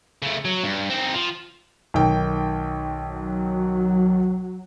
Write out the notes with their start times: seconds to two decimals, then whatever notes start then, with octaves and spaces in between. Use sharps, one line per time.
0.23 C#3 A3
0.45 F#3
0.64 G2
0.90 C4 D#4
1.14 F3
1.94 B1 D#3 G5
3.09 F#3